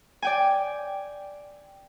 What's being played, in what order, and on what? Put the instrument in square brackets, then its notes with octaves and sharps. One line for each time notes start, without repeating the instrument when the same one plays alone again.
[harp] D5 G5 G#5